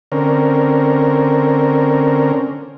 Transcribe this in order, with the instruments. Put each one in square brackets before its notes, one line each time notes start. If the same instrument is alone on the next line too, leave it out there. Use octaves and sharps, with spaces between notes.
[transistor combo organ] D3 C4 C#4 A#4